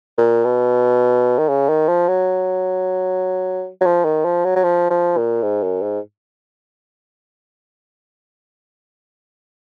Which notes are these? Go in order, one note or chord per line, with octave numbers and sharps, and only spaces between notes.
A#2
B2
D#3
C#3
D#3
F3
F#3
F#3
F3
D#3
F3
F#3
F#3
F3
F3
A#2
G#2
F#2
G#2